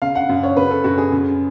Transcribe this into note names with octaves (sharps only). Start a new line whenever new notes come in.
C#3 F5
F#5
F#2
C#5
C#3 B4
A4
F#2 F#4
G#4
C#3